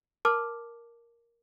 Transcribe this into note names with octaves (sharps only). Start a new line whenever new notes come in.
A#4 A5 D6 F6